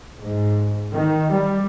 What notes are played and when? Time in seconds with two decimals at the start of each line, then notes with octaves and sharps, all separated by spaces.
0.19 G#2
0.94 D#3
1.34 G3